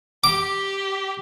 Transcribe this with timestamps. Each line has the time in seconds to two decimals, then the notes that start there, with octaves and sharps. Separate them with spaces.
0.24 G4 D6